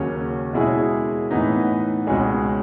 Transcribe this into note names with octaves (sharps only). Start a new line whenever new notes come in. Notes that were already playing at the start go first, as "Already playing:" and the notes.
Already playing: D#2 C#3 F#3 C#4
B2 G#3 C#4 E4 G#4
A2 E3 B3 D#4
C#2 B2 G#3 C#4 G#4